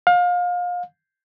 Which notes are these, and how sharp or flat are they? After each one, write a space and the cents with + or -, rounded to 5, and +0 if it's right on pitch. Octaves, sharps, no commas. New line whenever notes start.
F5 +30